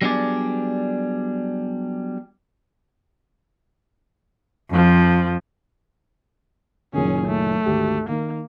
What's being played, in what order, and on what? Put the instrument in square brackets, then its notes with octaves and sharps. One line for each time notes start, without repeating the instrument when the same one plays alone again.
[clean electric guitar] F#3 G3 B3 D4 G#4 D5
[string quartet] F2 F3
[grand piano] F#1 A#2 D#3 [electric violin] C#4 G#4
[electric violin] A3
[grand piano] G#1 D2 G4
[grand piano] D#3 [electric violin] A#3